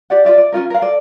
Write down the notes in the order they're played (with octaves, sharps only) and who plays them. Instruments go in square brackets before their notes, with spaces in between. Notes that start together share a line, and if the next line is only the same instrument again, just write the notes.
[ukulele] G4 D5 F#5
F4 D5 E5
D5
C#4 D#4 F4 A#4
A#4 F5
A4 D5